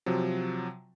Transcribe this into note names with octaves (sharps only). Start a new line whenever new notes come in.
C3 F3 F#3